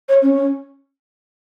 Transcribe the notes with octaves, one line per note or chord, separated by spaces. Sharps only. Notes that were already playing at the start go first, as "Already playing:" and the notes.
C#5
C#4